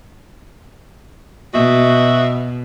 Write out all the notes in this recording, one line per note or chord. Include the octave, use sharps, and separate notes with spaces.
B2 F#4 D#5 E5